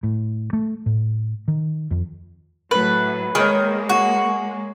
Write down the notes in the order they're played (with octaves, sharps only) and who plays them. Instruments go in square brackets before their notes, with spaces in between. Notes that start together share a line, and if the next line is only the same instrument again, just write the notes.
[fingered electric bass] A2
A3
A2
D#3
F2
[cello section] A2 F#3 [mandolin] B4
[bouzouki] D#3 [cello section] G#3 A#3 [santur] G#4 C#5
[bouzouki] F#4